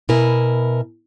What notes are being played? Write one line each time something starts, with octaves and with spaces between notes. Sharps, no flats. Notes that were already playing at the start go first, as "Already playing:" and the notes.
B2 E4 A#4 G#5